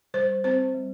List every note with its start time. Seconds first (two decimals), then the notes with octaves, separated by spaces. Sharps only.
0.14 G3 C5
0.44 C4 C5
0.74 G3